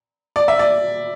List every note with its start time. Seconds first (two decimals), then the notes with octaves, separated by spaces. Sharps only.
0.36 D5
0.48 E5
0.59 D5